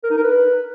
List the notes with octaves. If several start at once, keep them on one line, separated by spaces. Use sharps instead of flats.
A#4
D#4
A#4
B4